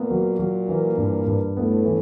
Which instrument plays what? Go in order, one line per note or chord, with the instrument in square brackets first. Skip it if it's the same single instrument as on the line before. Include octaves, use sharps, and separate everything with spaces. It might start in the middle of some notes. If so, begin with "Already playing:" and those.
Already playing: [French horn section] A#2 A#3 [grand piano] B3
[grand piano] F#3
F#3
E3
G2
G2
[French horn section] A2 A3 [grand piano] B3
[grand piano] E3